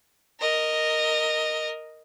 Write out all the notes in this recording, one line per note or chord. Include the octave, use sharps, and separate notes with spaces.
A#4 D#5